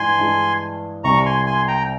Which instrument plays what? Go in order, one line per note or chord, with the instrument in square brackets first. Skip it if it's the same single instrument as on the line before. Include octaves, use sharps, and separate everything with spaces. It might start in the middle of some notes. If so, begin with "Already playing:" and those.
Already playing: [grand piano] G2 E3 G#3 [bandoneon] G#5 C6
[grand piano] G2 E3 G#3
[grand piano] C2 C3 G3 [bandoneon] A#5 C#6
[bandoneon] G#5 C6
G#5 C6
G5 A#5